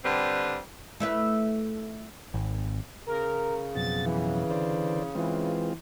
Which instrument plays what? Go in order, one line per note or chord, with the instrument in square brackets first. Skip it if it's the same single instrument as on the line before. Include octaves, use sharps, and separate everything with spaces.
[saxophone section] D3 G3 C4 B4
[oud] A3 E4 B4
[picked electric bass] G#1
[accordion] C#3 [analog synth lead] A#4
[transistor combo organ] F2 B2 F#3 [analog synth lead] A6
[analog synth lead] E3
[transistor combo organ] D3 C5 D5
[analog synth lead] E3 [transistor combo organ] G#3 C4 F4